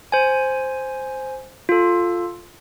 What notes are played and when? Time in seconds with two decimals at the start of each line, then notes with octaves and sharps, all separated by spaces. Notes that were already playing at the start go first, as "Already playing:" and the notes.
0.12 C5 G#5
1.69 F4 A4